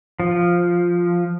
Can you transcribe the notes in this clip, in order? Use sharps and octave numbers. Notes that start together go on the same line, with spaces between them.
F3